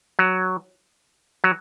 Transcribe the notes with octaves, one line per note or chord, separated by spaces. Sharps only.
F#3
F#3